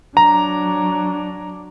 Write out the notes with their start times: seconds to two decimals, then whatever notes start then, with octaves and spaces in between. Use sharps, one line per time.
0.17 F#3 D4 A#5